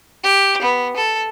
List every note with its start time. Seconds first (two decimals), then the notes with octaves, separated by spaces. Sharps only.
0.24 G4
0.61 B3
0.96 A4